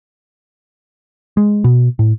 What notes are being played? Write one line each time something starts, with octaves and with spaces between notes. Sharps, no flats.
G#3
B2
A2